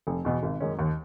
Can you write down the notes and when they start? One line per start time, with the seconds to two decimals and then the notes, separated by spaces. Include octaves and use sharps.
0.07 F1
0.25 E2 B2
0.43 G#1
0.60 F#2 D#3 G#3 C#4
0.79 D#2